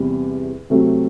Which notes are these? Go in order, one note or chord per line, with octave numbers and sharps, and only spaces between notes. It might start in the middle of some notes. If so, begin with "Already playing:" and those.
Already playing: E2 C3 G3
C3 F#3 A3 C4